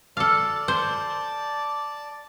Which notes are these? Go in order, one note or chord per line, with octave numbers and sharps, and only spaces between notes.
A4 D5 F5 A5
C5